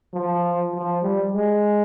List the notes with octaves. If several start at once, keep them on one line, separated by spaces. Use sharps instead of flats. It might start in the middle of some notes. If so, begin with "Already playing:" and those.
F3
F3
G3
G#3